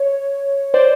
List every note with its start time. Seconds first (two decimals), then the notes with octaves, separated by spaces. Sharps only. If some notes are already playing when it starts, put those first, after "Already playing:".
Already playing: C#5
0.74 C5 D5